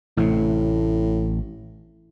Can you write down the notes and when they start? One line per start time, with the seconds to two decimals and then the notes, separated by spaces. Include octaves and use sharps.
0.17 A1 A2 C3